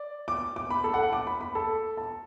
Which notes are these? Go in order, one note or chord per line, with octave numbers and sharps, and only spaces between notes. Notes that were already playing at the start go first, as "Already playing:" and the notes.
Already playing: D5
D6
D6
B5
A4
F#5
A5
D6
B5
B5
A4
A5